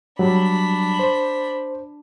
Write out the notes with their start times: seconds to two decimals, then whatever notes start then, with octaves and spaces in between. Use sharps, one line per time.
0.19 F#3 G3 D4 B5
0.99 C5